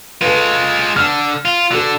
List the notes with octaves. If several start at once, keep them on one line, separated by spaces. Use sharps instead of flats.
G#3 F4 A4 B4
D3 F6
F4
D3 F#4 A4